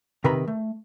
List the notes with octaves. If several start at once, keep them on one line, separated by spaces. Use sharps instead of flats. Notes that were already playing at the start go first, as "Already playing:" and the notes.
C3 D#3 A#4 B4 A#5 B5
A3